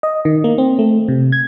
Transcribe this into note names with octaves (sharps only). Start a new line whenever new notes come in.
D#5
D#3
A#3
C4
A3
C3
G#6